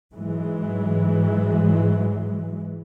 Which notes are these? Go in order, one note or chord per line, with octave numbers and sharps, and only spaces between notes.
G#2 E3 F#3 G#3